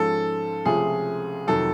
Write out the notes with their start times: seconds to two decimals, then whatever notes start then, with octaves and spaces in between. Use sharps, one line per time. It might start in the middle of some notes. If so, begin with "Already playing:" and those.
Already playing: G#2 F3 G#3 C#4 A4
0.65 C#2 C3 F3 A3 C#4 G#4
1.47 F2 C3 D#3 F#3 A4